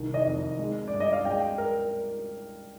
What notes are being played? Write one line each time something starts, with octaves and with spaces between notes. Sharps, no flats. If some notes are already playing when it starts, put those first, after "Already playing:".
Already playing: C2 D#3
D#5
F2
G#3
G2 D5
D#5
F5
G#3 G5
A#4